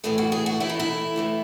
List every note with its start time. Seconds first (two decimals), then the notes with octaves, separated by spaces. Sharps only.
0.04 A2 E3 A3 G#4
0.18 F#4
0.32 G#4
0.46 F#4
0.60 A2 E3 A3 E4
0.69 D#4
0.80 E4
1.16 A2 E3 A3